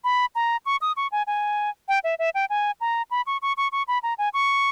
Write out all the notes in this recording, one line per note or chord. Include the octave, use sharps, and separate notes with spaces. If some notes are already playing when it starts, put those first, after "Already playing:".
B5
A#5
C#6
D#6
C#6
G#5
G#5
G5
E5
E5
G5
G#5
A#5
B5
C#6
C#6
C#6
C#6
B5
A#5
G#5
C#6